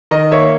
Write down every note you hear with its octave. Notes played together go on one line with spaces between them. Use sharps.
D#3 D#5
A#3 C#5 E5